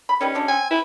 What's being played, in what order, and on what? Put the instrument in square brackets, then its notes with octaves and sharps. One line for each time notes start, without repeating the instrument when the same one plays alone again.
[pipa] B5
[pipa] D#3 G3 B4 [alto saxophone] C#4
[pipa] F#3 G#3 D4
[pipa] C4 [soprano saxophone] G#5
[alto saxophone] E4 [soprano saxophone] B4